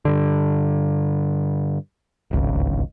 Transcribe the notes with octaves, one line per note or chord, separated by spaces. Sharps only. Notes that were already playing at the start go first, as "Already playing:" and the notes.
G2 D3
D1 G#1 C#2